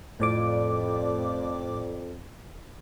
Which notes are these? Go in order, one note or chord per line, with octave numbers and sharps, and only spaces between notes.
F2 A2 D5 D6